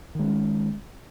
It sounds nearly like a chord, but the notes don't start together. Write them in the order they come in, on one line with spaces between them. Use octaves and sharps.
D#3 G#3 C#4